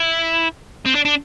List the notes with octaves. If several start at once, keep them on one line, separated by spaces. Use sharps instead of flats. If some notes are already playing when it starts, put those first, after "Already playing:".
Already playing: E4
C4
D4
D4